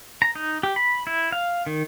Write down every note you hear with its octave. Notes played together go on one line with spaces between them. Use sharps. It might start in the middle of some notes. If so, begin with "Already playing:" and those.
A#5
D#4
G4
B5
E4
F5
D#3